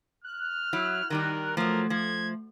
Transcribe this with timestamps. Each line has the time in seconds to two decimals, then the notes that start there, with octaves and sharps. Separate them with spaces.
0.24 F6 F#6
0.73 F#3 E4
1.10 D#3 G3 D#4 A#4
1.57 F3 F#3 A3 A#4
1.90 F3 G#6